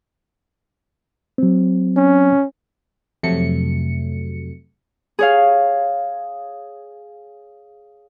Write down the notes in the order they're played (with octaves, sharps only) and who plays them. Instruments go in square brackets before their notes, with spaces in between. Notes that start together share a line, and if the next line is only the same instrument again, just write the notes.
[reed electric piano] F#3 C4
[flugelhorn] C#4
[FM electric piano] F2 C3 F#3 A3 C#7
[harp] G#4 C#5 F5